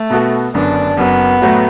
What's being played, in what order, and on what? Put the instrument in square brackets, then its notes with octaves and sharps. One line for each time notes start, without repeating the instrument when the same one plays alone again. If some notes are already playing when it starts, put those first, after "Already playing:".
Already playing: [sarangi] A3
[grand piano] B2 B3 F#4 A4
[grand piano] F#1 F#2 D3 B3 [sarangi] D4
[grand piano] F#1 F#2 F#3 [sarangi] B3
[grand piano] A2 F#3 A3 F#4